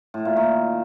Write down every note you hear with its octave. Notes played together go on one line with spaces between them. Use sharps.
A2
A#2
D#3